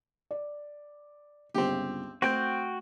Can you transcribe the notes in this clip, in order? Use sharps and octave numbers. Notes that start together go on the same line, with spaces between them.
D5
G1 C#2 C4 G4
A3 C4 F#4 G5 G6